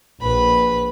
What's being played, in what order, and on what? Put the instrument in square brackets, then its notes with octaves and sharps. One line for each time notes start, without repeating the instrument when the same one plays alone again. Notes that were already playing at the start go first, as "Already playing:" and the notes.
[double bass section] A#1 [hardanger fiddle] B4 B5